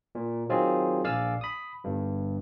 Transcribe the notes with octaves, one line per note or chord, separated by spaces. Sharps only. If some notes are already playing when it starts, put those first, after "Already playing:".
A#2
D#3 F#3 C4 F4 G#4
A#1 D5 F5 G#5 E6 F6
B5 D#6
G1 G2